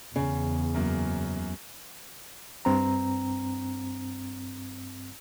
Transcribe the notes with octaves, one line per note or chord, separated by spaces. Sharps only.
E2 C#3
F#2 A#3
G2 C4 A#5